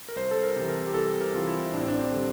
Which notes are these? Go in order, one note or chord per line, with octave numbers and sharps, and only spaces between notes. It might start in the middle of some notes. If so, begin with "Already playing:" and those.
A#4
C2 C5
A4
A#4
C3 E3
A#4
G4
C2 A4
A#4
C3 E3 F4
E4
A1 D4
C4
D4
C4
D3 G3